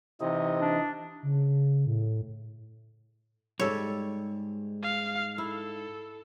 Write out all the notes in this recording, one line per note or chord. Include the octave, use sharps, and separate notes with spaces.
C3 E3 D#4 D#5
D4
C#3
A2
C#2 G#2 G3 A4 C#5
F5
E4 A4